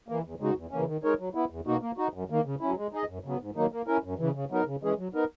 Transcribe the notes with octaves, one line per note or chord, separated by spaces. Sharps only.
E3 A#3
E2
C#3 G#3 D#4 F#4
E2
C#3 E3 A#3 C#4
D#3
G#3 D#4 A#4 C#5
F#3
B3 E4
E2
B2 A#3 D#4 F#4
A#3
D#4 F#4
F#2
D#3 A#3
C#3
F#3 C#4 E4
G#3
D#4 G#4 D#5
F#2
C#3 F#3 B3
G#2
D#3 F#3 A#3 D#4
A#3
C#4 E4 A#4
F#2
C#3 E3
C#3
F#3 B3 D#4 A#4
C#3
E3 G#3 C#4 G#4
F#3
B3 D#4 A#4